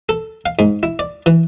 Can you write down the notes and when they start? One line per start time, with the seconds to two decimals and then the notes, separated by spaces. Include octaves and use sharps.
0.09 A4
0.46 F5
0.59 G#2
0.83 E4
0.99 D5
1.26 E3